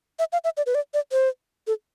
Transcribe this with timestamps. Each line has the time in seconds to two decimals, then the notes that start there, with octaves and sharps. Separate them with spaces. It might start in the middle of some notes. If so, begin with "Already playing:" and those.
0.19 E5
0.33 F5
0.44 E5
0.57 D5
0.66 B4
0.75 D5
0.94 D5
1.12 C5
1.67 A4